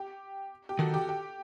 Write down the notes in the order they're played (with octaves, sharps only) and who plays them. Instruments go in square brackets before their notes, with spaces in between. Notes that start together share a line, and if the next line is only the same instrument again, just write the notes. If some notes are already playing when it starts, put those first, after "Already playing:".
Already playing: [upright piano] G4
G4
[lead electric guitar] D#3 [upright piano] F#4 A4
[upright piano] G4
G4